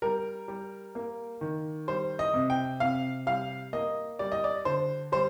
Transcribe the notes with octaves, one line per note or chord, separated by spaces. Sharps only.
G3 A#4
G3
A#3
D#3
G3 C5
D#5
C3
G5
C3 F5
G3 F5
A#3 D#5
G3 D5
D#5
D5
D3 C5
G3 C5